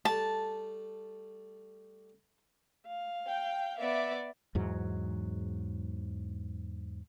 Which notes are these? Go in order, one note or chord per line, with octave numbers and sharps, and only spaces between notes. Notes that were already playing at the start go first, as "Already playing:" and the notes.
G3 A3 A5
F5
G5
B3 D5 E5 D6
E2 G#2 F#3